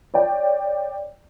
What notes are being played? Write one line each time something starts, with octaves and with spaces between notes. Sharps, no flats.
C#5 D5 G5